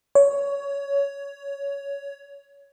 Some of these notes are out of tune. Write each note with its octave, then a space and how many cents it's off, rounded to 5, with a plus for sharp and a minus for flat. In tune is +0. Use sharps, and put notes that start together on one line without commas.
C#5 +15